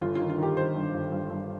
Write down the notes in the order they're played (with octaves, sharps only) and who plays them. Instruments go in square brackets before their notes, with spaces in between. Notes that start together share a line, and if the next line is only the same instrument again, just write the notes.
[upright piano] G1 F4
F4
D#3
F4
D#3 G4
D#3 C5
G2
G1
G2
G2